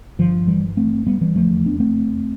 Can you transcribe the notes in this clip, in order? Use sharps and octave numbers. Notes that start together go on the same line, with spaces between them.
G1 G2 D3 F3
E3 G3
A3 C4
G3 B3
E3 G3
F1 E2 D3 F3 A3
B3 D4
A3 C4